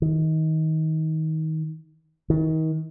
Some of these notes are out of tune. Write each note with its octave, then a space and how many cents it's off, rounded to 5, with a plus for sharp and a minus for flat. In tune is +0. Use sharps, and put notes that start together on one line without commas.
D#3 +25
D#3 +35